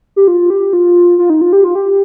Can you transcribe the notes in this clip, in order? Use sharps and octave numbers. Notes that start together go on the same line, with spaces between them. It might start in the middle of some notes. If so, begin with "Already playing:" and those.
G4
F4
G4
F4
F4
D#4
F4
G4
F4
G4